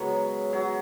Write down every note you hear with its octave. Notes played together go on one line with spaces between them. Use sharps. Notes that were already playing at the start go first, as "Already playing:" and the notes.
Already playing: C#3 F#3 G#3 B3
F#3